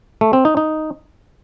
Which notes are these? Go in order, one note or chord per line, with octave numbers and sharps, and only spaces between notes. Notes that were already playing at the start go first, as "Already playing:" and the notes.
A3
C4
D#4
D#4